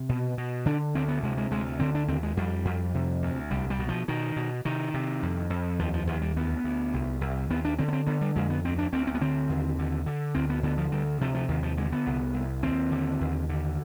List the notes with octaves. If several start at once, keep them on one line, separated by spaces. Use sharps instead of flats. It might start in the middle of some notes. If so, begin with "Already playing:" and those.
Already playing: C3
B2
B2
D3 D4
D2 C4
B3
C3 G#3
G#3
D2 G#3
D3 C4
D4
D#2 C4
G#3
F2 G3
F2
C3
D2
C2 G3
G3
B2
F3
B2 D#3
B2
C3 D#3
C3
F2
F2
D#2 F3
F3
D#2 F3
G3
D2 B3
D2
C2
C2
D#2 B3
D4
D3 C4
B3
C4
D3 B3
G3
F2 G#3
B3
D2 C4
D4
D2 C4
C4
B3
D3 C4
D#2
D3
D3
D2 C4
B3
D3 B3
F3
D2 G3
C3 F3
F3
D#2 D#3
F3
D3 G#3
B3
C2
C2
D#2 C4
D3
D#2
D3